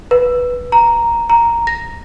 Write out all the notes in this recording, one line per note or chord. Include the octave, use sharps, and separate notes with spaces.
B4
A#5
A#5
A#6